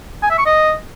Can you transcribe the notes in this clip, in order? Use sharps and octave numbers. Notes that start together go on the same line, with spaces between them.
G#5
E5
C#6
D#5